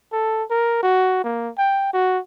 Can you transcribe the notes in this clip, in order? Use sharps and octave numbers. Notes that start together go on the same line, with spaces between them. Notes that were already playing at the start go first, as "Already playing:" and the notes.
A4
A#4
F#4
A#3
G5
F#4